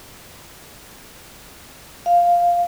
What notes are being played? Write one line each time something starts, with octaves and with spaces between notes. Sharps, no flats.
F5